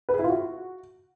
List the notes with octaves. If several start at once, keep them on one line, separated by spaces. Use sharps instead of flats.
B4
G#4
E4
F4
F#4